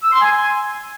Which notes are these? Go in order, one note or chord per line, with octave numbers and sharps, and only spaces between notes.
E6
C6
G#5